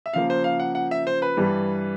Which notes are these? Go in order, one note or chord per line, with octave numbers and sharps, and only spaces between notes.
E5
C#3 F3 A#3 F5
C5
F5
F#5
F#5
E5
C5
B4
G2 E3 G3